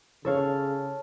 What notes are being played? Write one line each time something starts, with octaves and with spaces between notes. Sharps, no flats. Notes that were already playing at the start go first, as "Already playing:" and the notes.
C#3 A4 C#5 F5